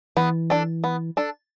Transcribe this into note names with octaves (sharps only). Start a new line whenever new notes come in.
E3 B3
D4 A4
B3
D4 A4